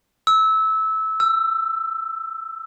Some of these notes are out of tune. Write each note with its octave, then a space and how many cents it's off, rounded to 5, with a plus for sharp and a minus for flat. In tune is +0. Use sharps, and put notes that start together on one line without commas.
E6 -20
E6 +15